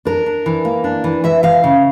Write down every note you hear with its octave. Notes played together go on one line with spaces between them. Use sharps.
D4 A#4
D4
E3
A#3
D4
E3
E3 E5
E3 F5
C#3